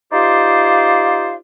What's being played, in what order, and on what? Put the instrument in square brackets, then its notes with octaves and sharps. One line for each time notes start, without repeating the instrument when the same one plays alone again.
[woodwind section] D#4 F4 G4 C5 D5 F5